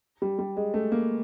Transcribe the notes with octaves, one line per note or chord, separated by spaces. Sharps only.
G3
G3
G#3
A3
A#3